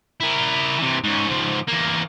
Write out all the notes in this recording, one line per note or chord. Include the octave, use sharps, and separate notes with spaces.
E4 A#4
C3 E3
G#2 C#4
G#2 F3
E2 A#3